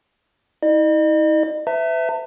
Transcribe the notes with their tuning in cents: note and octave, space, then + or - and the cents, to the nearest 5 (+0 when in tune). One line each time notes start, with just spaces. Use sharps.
E4 -45 D#5 -40
B4 +45 E5 +0 A5 +45